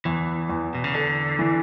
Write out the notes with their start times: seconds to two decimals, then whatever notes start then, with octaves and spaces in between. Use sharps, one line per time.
0.05 E2 E3
0.50 E2
0.75 B2
0.84 C#3
0.94 D3 A4
1.39 E3